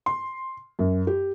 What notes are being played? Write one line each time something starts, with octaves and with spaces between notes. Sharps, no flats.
C6
F#2
G4